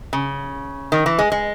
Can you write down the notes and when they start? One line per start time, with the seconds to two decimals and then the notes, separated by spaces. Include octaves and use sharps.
0.13 C#3
0.92 D#3
1.06 E3
1.19 G#3
1.32 G#3